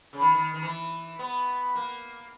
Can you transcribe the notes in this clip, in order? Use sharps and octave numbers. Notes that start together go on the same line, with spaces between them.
C#3
D#3
D#3
D#3
E3
B3
A#3